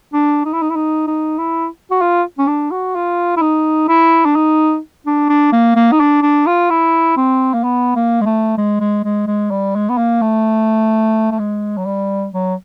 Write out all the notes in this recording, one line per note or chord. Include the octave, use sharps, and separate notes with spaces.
D4
D#4
E4
D#4
E4
D#4
D#4
E4
F#4
F4
C#4
D4
F#4
F4
E4
D#4
E4
D4
D#4
D4
D4
A#3
A#3
D#4
D4
D4
F4
E4
C4
A#3
B3
A#3
G#3
A3
G#3
G#3
G#3
G#3
G3
G#3
B3
A#3
A3
A3
G#3
F#3
G3
F#3